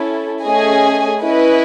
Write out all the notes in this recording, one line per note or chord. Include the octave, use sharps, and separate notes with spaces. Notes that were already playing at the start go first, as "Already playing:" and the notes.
Already playing: C#4 E4 A4
A3 C#4 G#4 D#5 G#5
C#4 E4 B4 D#5